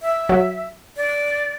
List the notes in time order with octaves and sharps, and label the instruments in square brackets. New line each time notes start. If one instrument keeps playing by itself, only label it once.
[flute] E5
[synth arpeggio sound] F#3
[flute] D5